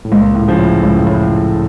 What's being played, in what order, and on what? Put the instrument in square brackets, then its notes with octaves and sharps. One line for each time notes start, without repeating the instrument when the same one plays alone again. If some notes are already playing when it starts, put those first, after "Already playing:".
[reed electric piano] A2
[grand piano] C#2 [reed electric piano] A#2
[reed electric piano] A2
[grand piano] C#3 F3
[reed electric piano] A2
[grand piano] C#2 [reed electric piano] A2
[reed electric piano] F#2
A2